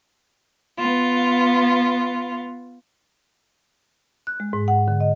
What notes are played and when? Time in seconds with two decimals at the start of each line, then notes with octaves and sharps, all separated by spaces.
0.77 B3 F4
4.27 F#6
4.40 G#3
4.53 G#2
4.68 F#5
4.88 D3
5.01 D#5